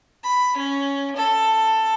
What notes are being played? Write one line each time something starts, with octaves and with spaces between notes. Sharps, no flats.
B5
C#4
A4